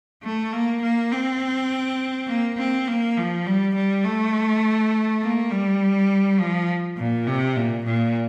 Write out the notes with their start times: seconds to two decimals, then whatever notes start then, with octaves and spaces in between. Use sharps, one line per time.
0.23 A3
0.53 A#3
0.82 A#3
1.12 C4
2.28 A#3
2.58 C4
2.88 A#3
3.17 F3
3.46 G3
3.75 G3
4.04 A3
5.22 A#3
5.51 G3
6.40 F3
6.98 A#2
7.27 C3
7.57 A#2
7.85 A#2